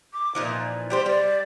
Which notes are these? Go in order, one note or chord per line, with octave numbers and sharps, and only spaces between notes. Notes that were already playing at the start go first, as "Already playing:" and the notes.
D6
A#2 E3 F3 D#4
G3 G4 C5
G3 D5